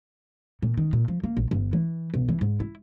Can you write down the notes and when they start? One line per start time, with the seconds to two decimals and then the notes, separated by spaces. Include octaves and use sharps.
0.62 A#2
0.78 D#3
0.93 A#2
1.08 F3
1.24 A#3
1.37 A#1
1.51 G1
1.73 E3
2.14 B1
2.29 E3
2.41 G#2
2.60 E4